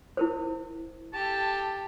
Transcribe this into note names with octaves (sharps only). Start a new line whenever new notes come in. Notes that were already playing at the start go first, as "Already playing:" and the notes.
E4 A#4 C5
G4 A4 A5